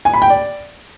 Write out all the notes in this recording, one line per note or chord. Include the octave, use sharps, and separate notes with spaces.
G#5
B5
G5
D5